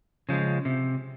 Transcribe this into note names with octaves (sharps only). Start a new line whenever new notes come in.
C#3 F3 G#3
C3